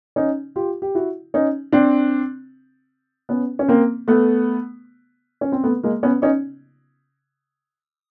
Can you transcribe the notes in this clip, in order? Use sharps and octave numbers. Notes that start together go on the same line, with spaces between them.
C#4 D#4
F4 G4
G4
E4 F#4
C#4 D#4
C4 D4
B3 C#4
C#4
A#3 C4
A3 B3
C#4
C4
A3 B3
G#3 A#3
B3 C#4
C#4 D#4